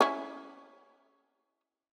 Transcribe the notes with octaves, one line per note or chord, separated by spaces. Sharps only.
C#4 E4